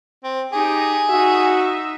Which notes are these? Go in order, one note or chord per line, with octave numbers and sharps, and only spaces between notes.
C4
D#4 G4 G#4
D#4 F#4 E5